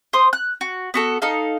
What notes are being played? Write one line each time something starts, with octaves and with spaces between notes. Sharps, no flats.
C5 C6 D#6
F#6
F#4
B3 F#4 A4
D#4 A4 F5